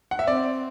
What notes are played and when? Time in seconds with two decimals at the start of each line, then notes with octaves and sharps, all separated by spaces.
0.11 F#5
0.19 E5
0.27 C4 D5